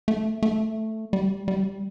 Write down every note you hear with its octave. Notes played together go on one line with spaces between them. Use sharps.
A3
A3
G3
G3